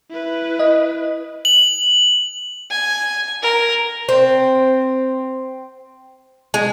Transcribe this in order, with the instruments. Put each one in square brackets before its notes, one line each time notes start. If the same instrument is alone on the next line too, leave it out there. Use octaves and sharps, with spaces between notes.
[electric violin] E4 B4
[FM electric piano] D#5
[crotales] F#7
[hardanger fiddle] G#5
A#4
[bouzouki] C4
G#3